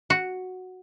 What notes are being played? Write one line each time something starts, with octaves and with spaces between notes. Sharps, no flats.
F#4